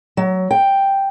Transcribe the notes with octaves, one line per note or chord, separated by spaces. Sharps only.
F#3
G5